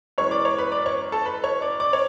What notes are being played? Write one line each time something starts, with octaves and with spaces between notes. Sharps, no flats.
F#2 E3 G#3 B3 C#5 C#6
D5 D6
C#5 C#6
B4 B5
D5 D6
C#5 C#6
A4 A5
B4 B5
C#5 C#6
D5 D6
D5 D6
C#5